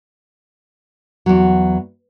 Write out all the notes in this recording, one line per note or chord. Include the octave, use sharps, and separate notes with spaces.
E2 F#3